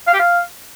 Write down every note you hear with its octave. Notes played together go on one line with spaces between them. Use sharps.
F5
G4
F5